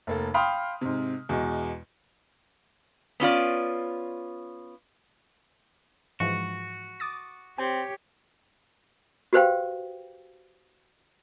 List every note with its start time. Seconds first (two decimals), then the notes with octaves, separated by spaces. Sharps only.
0.07 F1 A#3 A4
0.34 F5 G5 B5 C6 D#6 F6
0.81 G#2 C3
1.29 E2 B2 G#3
3.20 B3 C#4 F4 D5
6.20 G#2 E3 F3 F#4
7.00 D6 D#6 A6
7.58 C4 G4 C#5 G5
9.33 F#4 G4 B4 C5 F5 G5